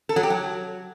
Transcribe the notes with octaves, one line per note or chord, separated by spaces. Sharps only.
A4
F#3
G4
F#3